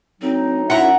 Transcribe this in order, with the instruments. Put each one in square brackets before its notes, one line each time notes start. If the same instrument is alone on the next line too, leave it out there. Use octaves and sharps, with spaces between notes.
[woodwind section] D2 F#3 D#4 [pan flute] C4
[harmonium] F#2 E5 [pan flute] E4 [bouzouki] F#5 A#5